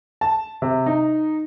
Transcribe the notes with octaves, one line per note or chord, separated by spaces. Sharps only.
A5
C3
D#4